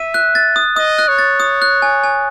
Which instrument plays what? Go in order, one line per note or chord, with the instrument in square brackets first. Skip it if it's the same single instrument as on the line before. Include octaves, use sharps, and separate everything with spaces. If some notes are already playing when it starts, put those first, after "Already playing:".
Already playing: [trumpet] E5 [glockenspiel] D#7
[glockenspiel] F#6
A6
D#6
[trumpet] D#5 [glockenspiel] D#6
[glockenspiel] F#6
[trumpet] C#5
[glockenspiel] A6
D#6
F#6
G#5
G#5